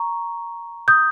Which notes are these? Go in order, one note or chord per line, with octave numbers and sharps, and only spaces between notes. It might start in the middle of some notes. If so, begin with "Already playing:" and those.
Already playing: A#5 C#6
D#6 G6